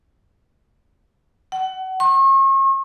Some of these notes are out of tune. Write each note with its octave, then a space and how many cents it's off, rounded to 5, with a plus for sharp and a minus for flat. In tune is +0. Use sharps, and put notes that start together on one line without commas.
F#5 +30
C#6 -40